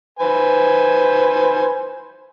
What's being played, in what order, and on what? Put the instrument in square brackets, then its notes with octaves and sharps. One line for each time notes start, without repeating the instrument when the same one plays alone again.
[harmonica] B4 C5 G#5